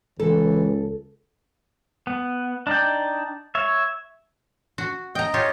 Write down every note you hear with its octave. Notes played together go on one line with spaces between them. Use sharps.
C#2 E3 A4
B3
D4 D#4 D5 G5
C#5 E5
F#4
D#5 G5 A#5
F4 G4 C#5